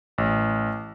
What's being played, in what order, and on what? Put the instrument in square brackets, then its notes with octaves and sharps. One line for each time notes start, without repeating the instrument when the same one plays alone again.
[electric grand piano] A1